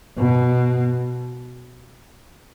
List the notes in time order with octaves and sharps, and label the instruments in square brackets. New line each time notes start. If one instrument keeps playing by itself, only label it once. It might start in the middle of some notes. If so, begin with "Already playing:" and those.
[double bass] B2